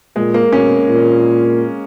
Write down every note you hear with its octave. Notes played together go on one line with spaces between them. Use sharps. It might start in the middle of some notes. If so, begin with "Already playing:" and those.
A#2 G#3
A#3
B2 C#4
A#2